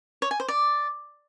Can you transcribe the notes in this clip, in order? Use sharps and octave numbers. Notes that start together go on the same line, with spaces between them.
C#5
G#5
C5
D5